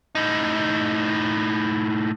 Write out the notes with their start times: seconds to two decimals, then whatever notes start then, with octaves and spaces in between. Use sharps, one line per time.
0.15 A2 D#4